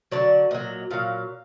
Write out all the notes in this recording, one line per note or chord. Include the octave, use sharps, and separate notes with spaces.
D3 F#3 D5
A#2 F#3 D#5
A#2 F#3 F5